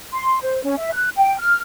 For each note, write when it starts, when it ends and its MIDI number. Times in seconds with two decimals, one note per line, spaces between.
0.13 0.38 84
0.41 0.62 72
0.64 0.75 61
0.78 0.92 76
0.93 1.09 90
1.17 1.36 79
1.39 1.60 89